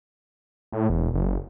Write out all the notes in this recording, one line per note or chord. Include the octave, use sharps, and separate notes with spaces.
A2
E1
F#1